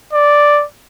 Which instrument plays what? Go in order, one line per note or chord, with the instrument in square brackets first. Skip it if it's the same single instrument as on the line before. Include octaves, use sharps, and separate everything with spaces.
[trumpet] D5